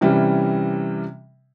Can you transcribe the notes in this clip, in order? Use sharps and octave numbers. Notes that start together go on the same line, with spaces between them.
C3 E3 G3 C#4